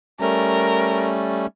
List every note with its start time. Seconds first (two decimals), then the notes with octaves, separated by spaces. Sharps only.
0.20 G3 A3 C#4 A#4